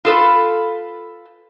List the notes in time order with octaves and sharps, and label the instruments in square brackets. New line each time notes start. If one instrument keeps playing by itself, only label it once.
[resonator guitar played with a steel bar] F4 A4 B4